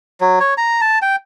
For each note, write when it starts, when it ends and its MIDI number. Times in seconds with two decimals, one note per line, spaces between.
0.21 0.39 54
0.40 0.54 73
0.58 0.81 82
0.81 0.99 81
1.02 1.16 79